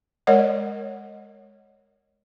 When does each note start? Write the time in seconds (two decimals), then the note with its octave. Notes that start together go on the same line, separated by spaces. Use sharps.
0.27 G#3 A#4 C#5 D#5 F#5